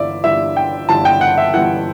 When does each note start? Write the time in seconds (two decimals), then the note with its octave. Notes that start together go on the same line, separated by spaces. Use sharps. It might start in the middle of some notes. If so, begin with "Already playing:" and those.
Already playing: G1 G2 E3 D5 E5
0.24 G1 G2 E3 E5
0.57 G5
0.89 G1 G2 E3 A5
1.05 G5
1.21 F#5
1.38 E5
1.54 G1 G2 E3 F#5